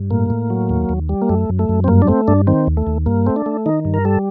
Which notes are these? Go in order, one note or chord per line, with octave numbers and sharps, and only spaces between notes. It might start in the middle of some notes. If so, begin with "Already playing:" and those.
Already playing: G2
A2 A#3
A2
F#3
D#2
D#2
G3
A#3
F#2 A3
F#2
A3
F#2
C4
G2 A#3
D4
A3 C4
G2 D4
D#3 C4
D#2
A3
D#2
G2 A#3
A3 C4
D4
A3
D#3 D#4
G2
A#4
G3 A4